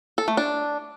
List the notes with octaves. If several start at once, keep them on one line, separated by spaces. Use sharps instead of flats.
A4
A3
D4